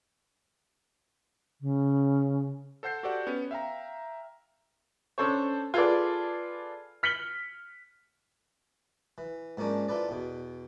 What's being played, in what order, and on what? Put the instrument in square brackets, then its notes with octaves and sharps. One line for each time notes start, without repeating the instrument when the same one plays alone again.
[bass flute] C#3
[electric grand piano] A4 C5 F#5 G6 C7
F#4 G4 A4 C5 D5 F#5
B3 C#4
E5 F5 G5 A#5
[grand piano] C#4 D4 A4 C5 C#5
F4 G#4 A4 B4 D5
F6 B6 C#7 F#7 G7
[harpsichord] E3
G#2 F3 A#3 C#4 D4
E4 F4 A4 B4 D5
E2 B2